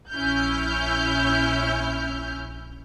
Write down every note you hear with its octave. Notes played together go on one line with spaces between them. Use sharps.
A#1 C#4 E4 F6 G6